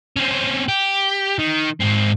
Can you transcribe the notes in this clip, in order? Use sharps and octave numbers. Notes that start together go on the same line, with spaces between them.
C4 C#4
G4
D#3
G#2 C4